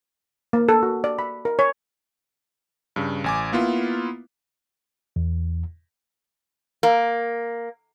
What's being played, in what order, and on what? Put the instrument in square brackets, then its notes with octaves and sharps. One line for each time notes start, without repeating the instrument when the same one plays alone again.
[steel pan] A#3
A4
F#4
D5
B5
A#4
C#5
[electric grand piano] G2 C#3
A1 G#5 D6
A#3 B3 E4 F4
[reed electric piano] E2
[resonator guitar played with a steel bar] A#3